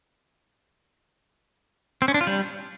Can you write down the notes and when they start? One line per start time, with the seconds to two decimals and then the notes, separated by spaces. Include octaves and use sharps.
2.02 C4
2.08 C#4
2.14 D4
2.21 F4
2.27 G3